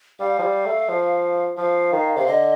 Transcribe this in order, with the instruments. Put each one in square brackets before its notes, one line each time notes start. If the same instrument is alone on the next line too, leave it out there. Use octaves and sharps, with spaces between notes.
[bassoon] G3 [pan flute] F5
[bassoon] F3
G3
A3
F3
[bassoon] F3 [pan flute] F5
[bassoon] D#3
[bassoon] C3 [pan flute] F5
[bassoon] D3 [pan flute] D#5